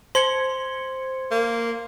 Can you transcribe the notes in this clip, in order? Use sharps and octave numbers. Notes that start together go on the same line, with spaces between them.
C5 C6 G#6 C#7 G7
A#3